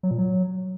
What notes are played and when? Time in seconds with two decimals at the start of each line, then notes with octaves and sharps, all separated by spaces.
0.03 F#3
0.11 A#2
0.18 F#3